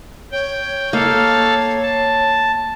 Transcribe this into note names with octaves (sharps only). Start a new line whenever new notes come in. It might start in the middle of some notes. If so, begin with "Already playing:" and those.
C#5 G5
A#3 A4 F5
A5